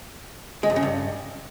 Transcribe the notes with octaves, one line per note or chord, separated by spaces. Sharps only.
G#3
G2
C#3
G2